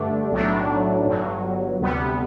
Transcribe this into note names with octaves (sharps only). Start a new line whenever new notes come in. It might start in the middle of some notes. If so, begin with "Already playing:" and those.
Already playing: G2 D3 A3 D4
B1 A2 F#3 A3 D4
G1 G2 F#3
D2 C3 G3 B3